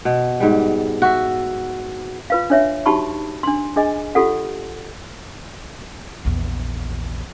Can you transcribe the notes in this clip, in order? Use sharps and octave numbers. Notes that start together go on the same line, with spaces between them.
B2
G#2 G3
F#4 E5
F4 B4 F5
D4 C#5 E5
D#4 F#4 G4 A5 B5 C#6
D4 C6
D4 G#4 D#5 G#5
F4 G4 A4 F#5
A#1 E2